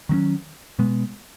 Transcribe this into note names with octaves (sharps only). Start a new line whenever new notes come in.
D#3 F#3 A#3 C#4
B2 G#3 B3